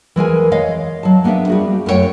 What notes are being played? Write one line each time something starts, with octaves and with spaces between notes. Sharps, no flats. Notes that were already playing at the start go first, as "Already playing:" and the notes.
E3 G#3 A#4 G#5
C#5 D#5 F5
F#3 F5 A5
A#3 B3 D4 B4 E5
G3 F#4 G#4
F#2 A3 C4 C#5 G5